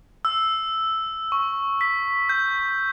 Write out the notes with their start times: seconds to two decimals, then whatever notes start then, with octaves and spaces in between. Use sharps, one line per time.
0.25 E6
1.32 C#6
1.81 B6
2.29 G6